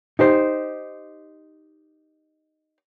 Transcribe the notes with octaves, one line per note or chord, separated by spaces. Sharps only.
D#4 G4 C5